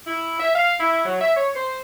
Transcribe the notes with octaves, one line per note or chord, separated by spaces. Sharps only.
E4
E5
F5
E4
F#3
E5
C#5
C5